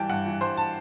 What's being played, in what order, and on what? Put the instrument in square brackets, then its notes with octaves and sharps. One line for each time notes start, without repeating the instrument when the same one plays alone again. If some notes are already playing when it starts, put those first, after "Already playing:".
Already playing: [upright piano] E3 G3 G5 A5
G2 F#5
E3
G2 C5
A5